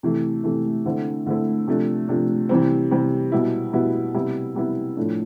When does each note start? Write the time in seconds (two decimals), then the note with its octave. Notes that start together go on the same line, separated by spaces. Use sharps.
0.03 C3 E3 A3
0.44 C3 E3 A3
0.86 D3 A3 C4 E4
1.26 D3 A3 C4 E4
1.68 C3 F3 A3 D4
2.08 C3 F3 A3 D4
2.49 C3 E3 G3 C4
2.91 C3 E3 G3 C4
3.32 B2 G3 B3 E4
3.73 B2 G3 B3 E4
4.14 C3 G3 B3 E4
4.55 C3 G3 B3 E4
4.97 A2 F3 A3 D4